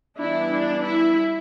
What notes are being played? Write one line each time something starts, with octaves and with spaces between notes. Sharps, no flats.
E3 G3 B3 D4 E4
D4
E4